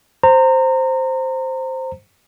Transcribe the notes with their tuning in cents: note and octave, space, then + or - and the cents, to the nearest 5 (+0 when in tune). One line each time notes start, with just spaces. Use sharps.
C5 +0 A#5 -25